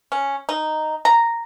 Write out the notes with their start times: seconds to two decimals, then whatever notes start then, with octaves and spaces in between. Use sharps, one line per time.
0.12 C#4
0.49 D#4
1.05 A#5